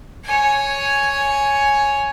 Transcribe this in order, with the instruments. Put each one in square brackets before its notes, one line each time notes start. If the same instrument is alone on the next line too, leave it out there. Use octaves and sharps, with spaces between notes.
[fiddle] C#5 G#5